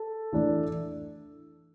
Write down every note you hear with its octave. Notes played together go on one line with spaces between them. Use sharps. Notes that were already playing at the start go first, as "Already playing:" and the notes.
Already playing: A4
E3 A3 D4